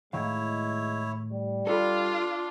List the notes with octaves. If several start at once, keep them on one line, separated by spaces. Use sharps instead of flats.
A2 D#3 G#3 E4 C#5 F5
G3
D4 F4 A4 B5